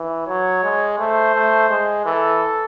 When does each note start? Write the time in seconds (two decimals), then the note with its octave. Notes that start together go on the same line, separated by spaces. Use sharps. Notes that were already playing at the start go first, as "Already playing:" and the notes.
Already playing: E3
0.27 F#3 C#5
0.63 G#3
0.99 A3 C5
1.35 A3
1.70 G#3
2.05 E3 A4